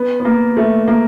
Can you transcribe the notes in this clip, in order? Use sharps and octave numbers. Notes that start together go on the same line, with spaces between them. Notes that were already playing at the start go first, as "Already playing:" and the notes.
Already playing: B3
B3
A#3
A3
A#3